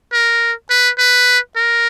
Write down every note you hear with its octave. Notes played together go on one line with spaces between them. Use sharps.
A#4
B4
B4
A#4